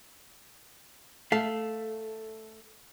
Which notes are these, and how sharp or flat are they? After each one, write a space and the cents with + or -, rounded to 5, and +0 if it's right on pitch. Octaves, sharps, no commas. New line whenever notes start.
A3 +0 F5 +0